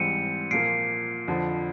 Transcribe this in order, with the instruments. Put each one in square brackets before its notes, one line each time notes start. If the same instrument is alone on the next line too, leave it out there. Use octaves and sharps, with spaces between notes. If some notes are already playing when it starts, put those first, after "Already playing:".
Already playing: [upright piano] G#2 E3 G3 C4 [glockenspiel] C#7 D#7
[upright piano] A#2 F3 A#3 [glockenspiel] C7 D7
[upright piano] F2 D3 F3